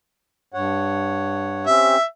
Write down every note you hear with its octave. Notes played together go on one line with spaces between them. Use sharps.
G2 C#5 F#5
C4 C#4 G4 E5